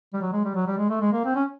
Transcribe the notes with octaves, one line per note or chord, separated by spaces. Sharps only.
G3
F#3
G#3
G3
F#3
G3
G#3
A3
G#3
A#3
C4
C#4